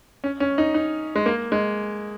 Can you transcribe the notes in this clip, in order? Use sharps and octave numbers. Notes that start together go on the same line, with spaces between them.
C#4
C#4
D#4
D#4
G#3
A#3
G#3